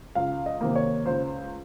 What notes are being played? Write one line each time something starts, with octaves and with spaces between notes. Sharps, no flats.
C#2 F5
D#5
C3 D#3 A#3
C#5
C#2 C5